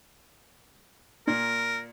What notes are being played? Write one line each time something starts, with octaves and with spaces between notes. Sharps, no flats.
A#2 A#4